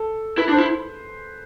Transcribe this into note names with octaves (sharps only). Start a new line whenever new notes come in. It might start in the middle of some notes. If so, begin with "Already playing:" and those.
Already playing: A4
E4 B4
D4 C5
E4